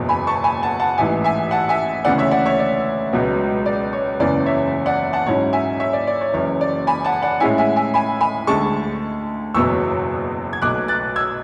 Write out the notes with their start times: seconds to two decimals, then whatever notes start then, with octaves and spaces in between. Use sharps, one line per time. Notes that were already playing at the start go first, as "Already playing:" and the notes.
Already playing: F#1 E2 B2
0.09 G#5 B5
0.27 A5 C#6
0.44 G#5 B5
0.62 F#5 A5
0.80 F#5 A5
0.98 A1 G#2 E3 E5 G#5
1.24 E5 G#5
1.51 F#5 A5
1.69 E5 G#5
2.05 D2 C#3 E3 B3 D5 F#5
2.18 C#5 E5
2.31 D5 F#5
2.46 C#5 E5
2.59 D5
3.13 C#2 B2 F#3 B3
3.66 D5
3.93 C#5
4.19 F#1 E2 C#3 E3 D5
4.46 C#5 E5
4.86 D5 F#5
5.13 F#5 A5
5.26 G#2 F#3 C#4 E4 C#5
5.53 E5 G#5
5.80 C#5 E5
5.93 D5
6.07 D5
6.21 C#5
6.33 F#1 F#2 E3 C#5
6.61 D5
6.87 G#5 B5
7.05 F#5 A5
7.23 D5 F#5
7.40 A2 G#3 C#4 E4 E5 G#5
7.58 E5 G#5
7.76 E5 G#5
7.94 G#5 B5
8.21 G#5 B5
8.47 D2 D3 G#3 A5 C#6
9.54 F#1 E2 B2 F#3 B3 C#6 E6
10.53 G#6
10.62 B1 B2 A3 D6 F#6
10.88 F#6 A6
11.16 E6 G#6